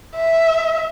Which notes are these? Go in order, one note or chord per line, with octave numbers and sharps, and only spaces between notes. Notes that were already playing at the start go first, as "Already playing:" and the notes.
E5